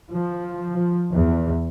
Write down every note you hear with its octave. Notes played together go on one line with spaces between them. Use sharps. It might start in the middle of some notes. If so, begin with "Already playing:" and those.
F3
E2